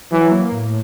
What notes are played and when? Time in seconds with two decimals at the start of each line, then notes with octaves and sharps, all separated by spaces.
0.12 E3 F#3
0.31 A#3
0.52 A2